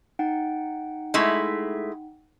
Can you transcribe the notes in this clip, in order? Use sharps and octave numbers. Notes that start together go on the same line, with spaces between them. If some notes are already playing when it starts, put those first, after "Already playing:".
D#4 F#5 G5
G#3 A3 E4